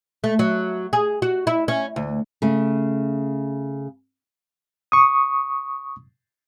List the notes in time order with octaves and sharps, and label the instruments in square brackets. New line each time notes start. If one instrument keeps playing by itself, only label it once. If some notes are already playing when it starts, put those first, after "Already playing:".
[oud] A3
F#3
G#4
F#4
E4
C#4
D2
[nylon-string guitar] C#3 A3
[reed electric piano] C#6 D#6